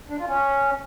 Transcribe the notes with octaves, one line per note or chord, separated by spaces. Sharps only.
D4
F4
C#4